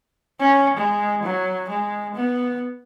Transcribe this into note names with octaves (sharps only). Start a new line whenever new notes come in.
C#4
G#3
F#3
G#3
B3